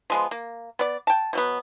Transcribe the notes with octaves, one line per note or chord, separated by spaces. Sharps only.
F3 G#3 B3
A#3
B3 D5
G5 A5
B2 F#3 B3